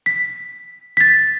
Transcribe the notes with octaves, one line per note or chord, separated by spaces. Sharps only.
B6
B6
A6